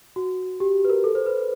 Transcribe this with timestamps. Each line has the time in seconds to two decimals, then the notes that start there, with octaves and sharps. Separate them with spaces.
0.16 F#4
0.60 G4
0.85 B4
0.90 A#4
1.04 A4
1.15 C5
1.26 B4